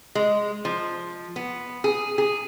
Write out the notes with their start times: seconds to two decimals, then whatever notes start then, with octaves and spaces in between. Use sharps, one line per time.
0.15 G#3
0.65 F3
1.36 B3
1.84 G#4
2.18 G#4